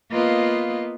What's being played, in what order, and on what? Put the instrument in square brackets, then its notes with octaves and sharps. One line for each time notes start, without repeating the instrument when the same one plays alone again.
[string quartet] A#3 B3 F4 B4 D#5